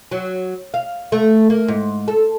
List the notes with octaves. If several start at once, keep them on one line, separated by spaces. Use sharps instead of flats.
F#3
F5
A3
A#3
G#2
A4